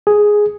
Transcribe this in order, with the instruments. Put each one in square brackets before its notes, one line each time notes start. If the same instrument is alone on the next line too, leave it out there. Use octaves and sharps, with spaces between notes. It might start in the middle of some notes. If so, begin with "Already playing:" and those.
[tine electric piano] G#4